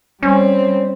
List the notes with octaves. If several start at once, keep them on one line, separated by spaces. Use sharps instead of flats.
G3 C4 C#4